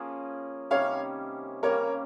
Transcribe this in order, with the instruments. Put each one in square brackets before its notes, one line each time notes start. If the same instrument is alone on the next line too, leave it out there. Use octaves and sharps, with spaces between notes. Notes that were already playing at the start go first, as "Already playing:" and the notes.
Already playing: [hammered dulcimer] F3 A#3 C#4 G#4
[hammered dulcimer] C3 D#3 G3 C#4 [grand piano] C#5 F5
[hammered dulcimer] C#3 G3 A#3 [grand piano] A#4 C#5